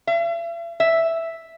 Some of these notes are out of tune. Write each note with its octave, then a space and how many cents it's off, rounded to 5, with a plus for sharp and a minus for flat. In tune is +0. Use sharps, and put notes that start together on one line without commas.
E5 +45
E5 +0